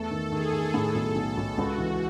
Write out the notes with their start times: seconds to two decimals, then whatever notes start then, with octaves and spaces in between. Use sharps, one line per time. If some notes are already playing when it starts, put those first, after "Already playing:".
Already playing: E2 A3 A4
0.11 D#3
0.32 D#3 G#4
0.53 D#3
0.74 A2 A4
0.95 B1
1.16 B1 A4
1.37 B1
1.58 C#2 F#4
1.78 E3